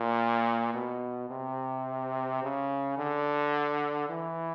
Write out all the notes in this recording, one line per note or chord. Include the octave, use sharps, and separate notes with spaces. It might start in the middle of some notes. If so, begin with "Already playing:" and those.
Already playing: A#2
B2
C3
C#3
D3
E3